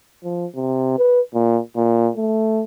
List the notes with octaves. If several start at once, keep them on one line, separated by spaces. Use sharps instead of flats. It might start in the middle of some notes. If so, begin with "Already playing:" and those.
F3
C3
B4
A#2
A#2
A3